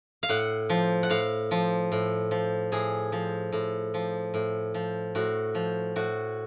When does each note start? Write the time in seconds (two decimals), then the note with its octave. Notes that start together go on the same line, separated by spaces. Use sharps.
0.23 F5
0.29 A2 F#5
0.70 F3
1.03 F#5
1.10 A2 F5
1.51 F3
1.92 A2
2.31 F3
2.72 A2 G#4
3.12 F3
3.52 A2
3.94 F3
4.34 A2
4.74 F3
5.15 A2 F#4
5.55 F3
5.96 A2 F#4